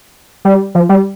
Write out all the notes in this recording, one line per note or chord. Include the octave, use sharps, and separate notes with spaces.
G3
F3
G3